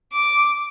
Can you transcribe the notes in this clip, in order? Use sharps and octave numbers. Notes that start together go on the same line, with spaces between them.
D6